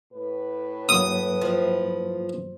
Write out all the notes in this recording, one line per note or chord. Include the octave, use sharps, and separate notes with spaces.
A2 B4
G2 F#3 A#3 D#6
F3